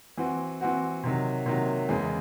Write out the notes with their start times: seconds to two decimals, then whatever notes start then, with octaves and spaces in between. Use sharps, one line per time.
0.17 E3 C4 F#4
0.61 E3 C4 F#4
1.04 C3 D#3 F#3
1.46 C3 D#3 F#3
1.89 E2 C#3 G#3